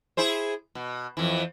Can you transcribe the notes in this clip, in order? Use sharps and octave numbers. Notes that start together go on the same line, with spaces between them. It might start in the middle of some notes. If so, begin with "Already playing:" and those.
E4 G#4 C5
B2
F2 E3